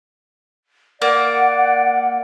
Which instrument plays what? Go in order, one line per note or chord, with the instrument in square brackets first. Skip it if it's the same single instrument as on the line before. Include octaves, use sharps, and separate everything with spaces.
[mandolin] A#3 [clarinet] D5 [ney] F#5